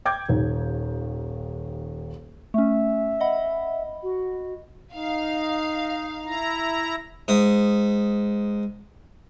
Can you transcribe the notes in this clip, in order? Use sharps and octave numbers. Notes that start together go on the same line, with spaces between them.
G5 D6 G6 G#6
D#1 D#2
A3 C#4 E5
D#5 F#5 B5
F#4
D#4 F5
E4 A#5
G#2 D#6